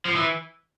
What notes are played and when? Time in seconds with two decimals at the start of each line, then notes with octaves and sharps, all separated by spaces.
0.05 F3
0.15 E3